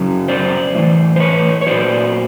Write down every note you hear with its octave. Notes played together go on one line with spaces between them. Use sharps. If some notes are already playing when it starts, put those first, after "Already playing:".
Already playing: F#2 C#3 F#3
C5 D5
A2 E3
C5
B4 C#5
C#5
A#2 F#3 C5 D5